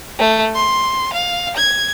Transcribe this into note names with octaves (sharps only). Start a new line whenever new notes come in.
A3
C6
F5
G#6